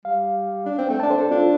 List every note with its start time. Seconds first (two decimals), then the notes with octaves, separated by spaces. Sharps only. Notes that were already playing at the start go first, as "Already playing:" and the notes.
0.05 G3 F5
0.66 D4
0.78 C4
0.89 A3 G5
1.00 A5
1.03 D4
1.11 C5
1.17 C4 A4
1.31 D4 F4